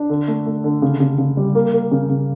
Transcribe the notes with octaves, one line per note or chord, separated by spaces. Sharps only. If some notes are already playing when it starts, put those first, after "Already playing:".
Already playing: D4
D3
A3
A3
D3
C#3
C#3
C#3
G3
A#3
A#3
C#3
C#3